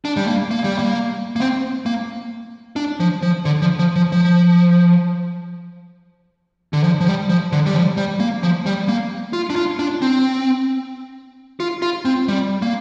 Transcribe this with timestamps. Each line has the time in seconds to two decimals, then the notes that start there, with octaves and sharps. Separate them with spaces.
0.05 D4
0.17 G3
0.28 A#3
0.51 A#3
0.64 G3
0.79 A#3
1.36 A#3
1.40 C4
1.86 A#3
2.76 D4
3.00 F3
3.23 F3
3.45 D3
3.62 F3
3.79 F3
3.96 F3
4.12 F3
6.73 D3
6.84 F3
7.00 F3
7.07 G3
7.29 F3
7.52 D3
7.66 G3
7.75 F3
7.97 G3
8.20 A#3
8.43 F3
8.66 G3
8.89 A#3
9.33 F4
9.50 D4
9.56 F4
9.79 D4
10.02 C4
11.60 F4
11.82 F4
12.05 C4
12.28 G3
12.62 A#3